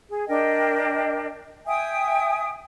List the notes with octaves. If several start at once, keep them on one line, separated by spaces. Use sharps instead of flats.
G#4
D4 A#4 D#5 G5
E5 G5 G#5 D#6